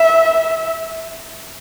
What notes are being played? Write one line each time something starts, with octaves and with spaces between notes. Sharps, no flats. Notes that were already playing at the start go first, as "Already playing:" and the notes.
Already playing: E5